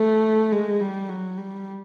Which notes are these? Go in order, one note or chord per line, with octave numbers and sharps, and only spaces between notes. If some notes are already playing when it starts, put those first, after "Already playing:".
Already playing: A3
G#3
G3
F#3
G3